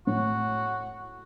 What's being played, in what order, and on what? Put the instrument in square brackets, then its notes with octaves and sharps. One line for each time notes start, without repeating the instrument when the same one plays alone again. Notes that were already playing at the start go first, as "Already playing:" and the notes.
[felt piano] A2 [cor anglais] F#4